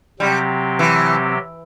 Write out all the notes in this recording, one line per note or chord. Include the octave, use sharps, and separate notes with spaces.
C3 F#3 G3 C4 G4
E3